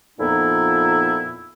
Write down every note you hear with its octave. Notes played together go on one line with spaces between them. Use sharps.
F2 A#2 B3 D#4 E4